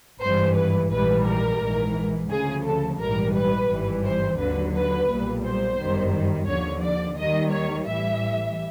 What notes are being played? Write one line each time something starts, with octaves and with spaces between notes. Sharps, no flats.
G#1 G2 E3 C5
B4
A#1 G#2 E3 G3 B4
A#4
A#1 G#2 E3
D2 C#3 F3 G#4
A4
A#1 G#2 E3 G3 A#4
B4
G#1 G2 E3 G3
C5
D#2 D3 F#3 B4
B4
B1 A#2 G3
C5
G1 F#2 D#3 G3
D#2 D3 F3 C#5
D5
D#2 D#3 G3 D#5
C#5
A1 A2 E3 G3 E5